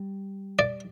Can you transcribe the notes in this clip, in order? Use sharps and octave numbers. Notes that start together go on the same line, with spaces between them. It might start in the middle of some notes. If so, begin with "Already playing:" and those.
Already playing: G3
D5